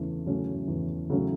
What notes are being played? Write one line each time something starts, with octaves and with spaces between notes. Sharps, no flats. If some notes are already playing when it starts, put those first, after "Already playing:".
Already playing: E2 C#3 A3 C#4
C#3 F#3 A3 C#4
E2
C#3 F#3 A3 C#4